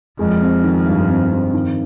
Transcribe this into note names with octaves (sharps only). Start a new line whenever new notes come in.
F2 G#3
C4
D#3
G2
C4
C4
D#3